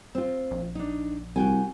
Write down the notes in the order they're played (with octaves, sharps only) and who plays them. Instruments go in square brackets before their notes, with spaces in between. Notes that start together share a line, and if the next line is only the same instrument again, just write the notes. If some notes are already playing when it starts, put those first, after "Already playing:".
[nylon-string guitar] C4 F4
[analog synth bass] A#1
[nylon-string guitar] D4 D#4
[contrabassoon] C2 [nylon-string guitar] F#4 G5 G#5